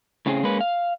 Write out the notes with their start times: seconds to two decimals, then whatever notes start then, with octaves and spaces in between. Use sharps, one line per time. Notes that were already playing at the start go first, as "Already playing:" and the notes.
0.26 A2 C#3 C4 C#4 G#4
0.43 G#3 A#3 C#4 B4
0.61 F5